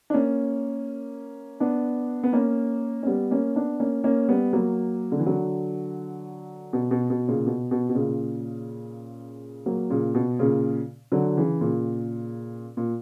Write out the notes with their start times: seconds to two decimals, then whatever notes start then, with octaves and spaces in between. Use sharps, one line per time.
0.10 D4
0.14 A#3 C#4
1.60 B3 D4
2.23 B3
2.33 A#3 C#4
3.03 C#4
3.06 G3 B3
3.31 A#3 C#4
3.55 B3 D4
3.80 A#3 C#4
4.04 A#3 C#4
4.28 G3 B3
4.53 F#3 A#3
5.12 D3
5.19 E3
5.26 D3 F#3
6.73 B2
6.91 B2
7.10 B2
7.28 A#2 C#3
7.47 B2
7.71 B2
7.89 B2
7.95 A#2 C#3
9.66 F#3 A#3
9.90 A#2 C#3
10.15 B2
10.39 A#2 C#3
11.12 D3 F#3
11.37 C#3 E3
11.61 A#2 C#3
12.77 A#2